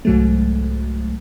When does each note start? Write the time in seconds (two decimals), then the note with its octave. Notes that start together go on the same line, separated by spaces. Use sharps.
0.05 C2 G#2 F#3 G#3 A3